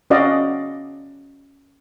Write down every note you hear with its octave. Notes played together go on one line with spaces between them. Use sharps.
C#4 F#4 D5 D#5 F5